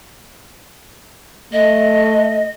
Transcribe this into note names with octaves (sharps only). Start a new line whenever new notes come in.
A3 D#5